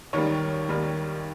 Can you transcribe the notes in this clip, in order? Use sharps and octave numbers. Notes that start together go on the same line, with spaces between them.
D#2 D#3 G3 C#5
D#2 D#3 G3